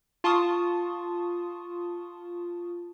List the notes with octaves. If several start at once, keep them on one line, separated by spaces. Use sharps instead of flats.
F4 A5 C6 C#6 D#6